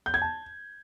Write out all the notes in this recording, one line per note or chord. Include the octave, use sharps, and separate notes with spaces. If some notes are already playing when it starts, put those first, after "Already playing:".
G6
G#6
A5